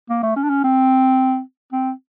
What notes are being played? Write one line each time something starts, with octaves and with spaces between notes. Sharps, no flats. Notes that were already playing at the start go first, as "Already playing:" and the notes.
A#3
A3
C#4
D4
C#4
C4
C4